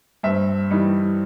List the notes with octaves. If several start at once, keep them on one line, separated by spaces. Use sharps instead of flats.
G2 C5 E5
E3 G3 D#4